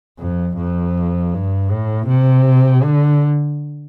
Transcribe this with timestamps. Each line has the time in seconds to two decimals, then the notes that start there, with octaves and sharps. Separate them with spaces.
0.19 F2
0.57 F2
1.33 G2
1.71 A2
2.08 C3
2.83 D3